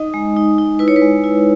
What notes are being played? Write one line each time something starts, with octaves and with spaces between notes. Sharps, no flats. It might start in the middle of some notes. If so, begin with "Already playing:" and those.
Already playing: D#4 D#5
G#3
D#4
D#4
E4 B4
C#5
B4
G#3
E4